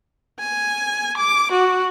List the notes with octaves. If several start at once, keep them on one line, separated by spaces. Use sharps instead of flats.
G#5
D6
F#4